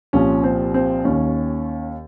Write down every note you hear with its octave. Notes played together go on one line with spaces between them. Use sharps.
C2 A#2 F3 C#4
C4
C4
D#2 D#3 C#4